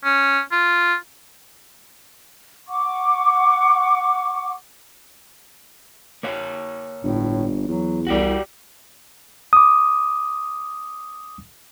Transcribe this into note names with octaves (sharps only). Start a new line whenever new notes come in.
C#4
F4
F#5 C#6 D6
A#3 C#5 F5
G1 A2
E2 F#3
C2 F#4 G4 D5
D6 D#6